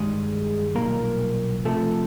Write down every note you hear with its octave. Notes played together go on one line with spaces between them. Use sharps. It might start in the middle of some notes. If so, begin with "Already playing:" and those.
Already playing: G2 D#3 G3 G#3 G#4
B1 A#2 G3 A#3 A#4
C2 C3 F3 A3 A4